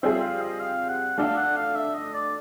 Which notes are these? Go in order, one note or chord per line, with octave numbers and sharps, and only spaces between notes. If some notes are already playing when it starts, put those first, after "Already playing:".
G3 C4 F4 G#4 E5
F5
D#5
F5
F#5
A3 D4 F#4 A4 F5
F#5
F5
E5
D#5
D5